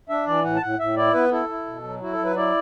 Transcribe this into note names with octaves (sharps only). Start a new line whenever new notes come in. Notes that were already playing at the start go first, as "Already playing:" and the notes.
D4 E5
E3 D5
A2 F#5
A5
A2 F#5
A2 E5
E4 D5
B3 B4
E4 A4
E4
B2
F#3
E4 F#4
A4
F#3
B4
E4 D5